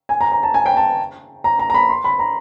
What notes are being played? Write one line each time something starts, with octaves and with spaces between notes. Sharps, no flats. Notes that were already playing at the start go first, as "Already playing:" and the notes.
G#5
A#5
A#5
A5
G#5
G5
A5
A#5
A#5
A#5
B5
C6
B5
A#5